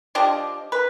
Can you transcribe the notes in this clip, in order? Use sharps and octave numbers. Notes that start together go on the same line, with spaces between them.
F3 D4 G4 D#5
B4